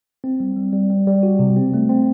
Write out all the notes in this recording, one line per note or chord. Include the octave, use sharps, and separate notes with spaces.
C4
G3
G3
G3
G3
G3
F#4
C3
C4
A3
C4